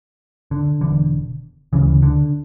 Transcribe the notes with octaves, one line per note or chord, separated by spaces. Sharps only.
D3
E1 E2 D3
D2 C#3 E3
D3